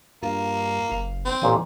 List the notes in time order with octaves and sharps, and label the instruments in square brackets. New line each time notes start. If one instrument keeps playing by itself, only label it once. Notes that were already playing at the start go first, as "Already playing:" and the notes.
[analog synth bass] G2 [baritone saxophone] A#3 [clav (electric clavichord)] F4
[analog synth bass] F#1 [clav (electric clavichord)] F5
[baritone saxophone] C4
[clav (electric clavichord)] A1 A#2 G#5 [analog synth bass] E3